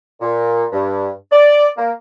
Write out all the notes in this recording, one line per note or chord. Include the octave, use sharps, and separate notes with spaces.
A#2
G2
D5
A#3